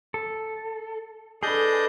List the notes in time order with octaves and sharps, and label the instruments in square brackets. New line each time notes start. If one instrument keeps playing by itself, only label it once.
[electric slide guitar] A4
[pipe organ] D4 D#5 G6 [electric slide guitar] G#4 [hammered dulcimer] A4 B4